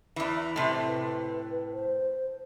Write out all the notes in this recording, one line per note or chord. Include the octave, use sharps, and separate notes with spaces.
E2 E3
A2 C3
B4
C5